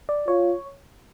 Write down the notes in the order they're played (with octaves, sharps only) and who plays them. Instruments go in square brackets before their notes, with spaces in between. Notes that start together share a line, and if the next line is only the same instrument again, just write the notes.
[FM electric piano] D5
[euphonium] F4 [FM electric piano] C#5